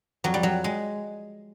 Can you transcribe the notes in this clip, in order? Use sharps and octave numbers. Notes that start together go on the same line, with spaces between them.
F2 F#3
G3
F#3
G#3